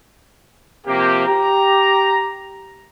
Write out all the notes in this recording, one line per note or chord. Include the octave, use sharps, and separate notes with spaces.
C3 F3 A#3 G4
G4 A#5